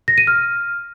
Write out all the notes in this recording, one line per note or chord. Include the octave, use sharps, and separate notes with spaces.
A#6
D#7
F6